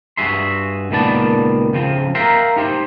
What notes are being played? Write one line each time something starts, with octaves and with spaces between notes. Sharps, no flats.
G2 F#4 G#4 E5 C6
C#2 A#2 D#3 B3 D5 A5
C#3 F3 C4
A#4 E5 F5 G5 A#5 C6
D#4 G4 C5